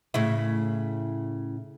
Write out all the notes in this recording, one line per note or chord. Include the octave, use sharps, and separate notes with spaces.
A2 C#3 E4